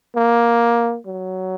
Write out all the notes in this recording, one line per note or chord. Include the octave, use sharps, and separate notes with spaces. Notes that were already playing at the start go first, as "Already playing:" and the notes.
A#3
F#3